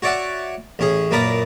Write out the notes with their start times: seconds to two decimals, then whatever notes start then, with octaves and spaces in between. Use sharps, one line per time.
0.02 F#4 C#5 D5 E5 F#5
0.79 A1 C#4 G#4
1.11 F#2 A#2 A#4 B4 D5 D#6